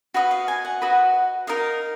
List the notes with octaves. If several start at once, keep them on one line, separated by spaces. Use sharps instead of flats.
F#4 B4 D#5 F5
F5
G#5
F#5
F#4 B4 D#5
D#4 A#4 D#5 F5